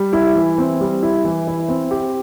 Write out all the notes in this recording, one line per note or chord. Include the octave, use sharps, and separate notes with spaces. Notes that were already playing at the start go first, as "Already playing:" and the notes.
Already playing: G3
E4
E3
C4
G3
E4
E3
E4
C4
G4